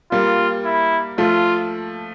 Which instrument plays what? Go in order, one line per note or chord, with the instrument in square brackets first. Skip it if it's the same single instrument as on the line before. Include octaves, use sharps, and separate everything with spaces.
[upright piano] G3 A#3 [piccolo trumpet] F4
[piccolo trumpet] E4
[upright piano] F3 A3 [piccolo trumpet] F4